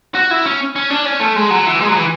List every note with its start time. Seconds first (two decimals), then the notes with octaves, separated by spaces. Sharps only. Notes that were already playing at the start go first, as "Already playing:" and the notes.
0.15 F#4
0.31 E4
0.45 C#4
0.76 C#4
0.90 D4
1.05 C#4
1.20 A3
1.36 G#3
1.50 F#3
1.66 E3
1.81 G#3
1.89 F#3
1.97 E3